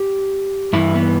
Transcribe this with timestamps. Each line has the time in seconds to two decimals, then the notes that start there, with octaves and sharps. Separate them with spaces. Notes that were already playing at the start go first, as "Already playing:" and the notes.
Already playing: G4
0.73 G2 E3 E4
0.95 B3